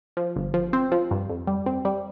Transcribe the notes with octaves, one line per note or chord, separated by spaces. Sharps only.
F3
G1
F3
C4
F3
G2
F2
G3
C4
G3